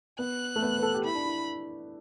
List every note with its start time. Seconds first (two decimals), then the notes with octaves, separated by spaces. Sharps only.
0.19 B3 F#6
0.56 A3
0.62 B3
0.78 B4
0.83 A4
0.94 G4
1.04 E4 B5
1.15 D4
1.26 E4